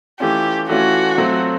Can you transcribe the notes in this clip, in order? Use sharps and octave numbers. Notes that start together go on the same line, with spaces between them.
E3 A3 C#4 F4 G4
E3 A3 C#4 F4 F#4
F#3 A3 C4 F4